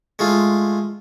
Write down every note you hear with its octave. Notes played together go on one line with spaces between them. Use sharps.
G#3 A3 F4